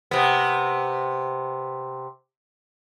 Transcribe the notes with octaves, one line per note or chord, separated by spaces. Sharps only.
C3 B3